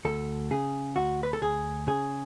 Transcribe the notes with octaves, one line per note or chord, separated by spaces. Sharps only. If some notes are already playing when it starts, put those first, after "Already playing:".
D2 A4
C#3 G#4
D2 F#4
B4
A4
D2 G#4
C#3 G#4